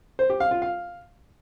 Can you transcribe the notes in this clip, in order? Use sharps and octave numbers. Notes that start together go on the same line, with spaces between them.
C5
G4
F5
F4
F5